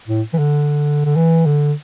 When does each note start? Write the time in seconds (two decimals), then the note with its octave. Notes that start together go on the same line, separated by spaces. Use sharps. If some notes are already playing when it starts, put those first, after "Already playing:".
0.08 A2
0.33 E3
0.38 D3
1.05 D3
1.16 E3
1.46 D3